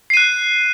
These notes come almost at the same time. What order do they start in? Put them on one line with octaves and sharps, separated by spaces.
C7 D#7 F#6